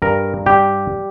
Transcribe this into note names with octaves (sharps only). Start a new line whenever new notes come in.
G2 A#4
G3 G4